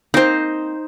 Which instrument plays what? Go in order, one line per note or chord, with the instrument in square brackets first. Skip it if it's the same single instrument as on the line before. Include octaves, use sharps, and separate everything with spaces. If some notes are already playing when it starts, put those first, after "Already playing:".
[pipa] A#3 C4 [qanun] D#4 C5